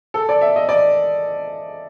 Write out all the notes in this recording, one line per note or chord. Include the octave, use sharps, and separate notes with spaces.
A4
D5
E5
D#5
D5